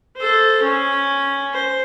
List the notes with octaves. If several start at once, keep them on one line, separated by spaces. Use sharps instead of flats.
A4 C5
C#4
C5